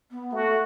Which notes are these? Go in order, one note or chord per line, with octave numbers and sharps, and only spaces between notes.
B3
A3 F#4